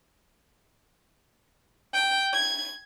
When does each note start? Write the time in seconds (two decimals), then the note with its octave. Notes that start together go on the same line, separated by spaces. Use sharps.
1.93 G5
2.33 G#6